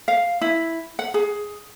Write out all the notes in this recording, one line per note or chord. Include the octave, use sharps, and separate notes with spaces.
F5
E4
F#5
G#4